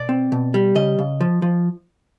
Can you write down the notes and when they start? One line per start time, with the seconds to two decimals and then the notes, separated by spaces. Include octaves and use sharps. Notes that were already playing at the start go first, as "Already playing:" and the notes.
Already playing: B2 D5
0.09 C4
0.32 B2
0.54 G3
0.75 C#3 D#5
0.99 C#3
1.21 F3
1.42 F3